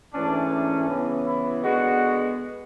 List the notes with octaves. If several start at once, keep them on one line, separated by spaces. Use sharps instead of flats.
G#2 E3 A3 C#4 D4
D4
C#3 E3 B3
E4
D3 G#3 B3 F#4